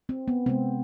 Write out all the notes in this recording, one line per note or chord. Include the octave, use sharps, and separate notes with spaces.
C4
B3
C3 G#3 B3 C4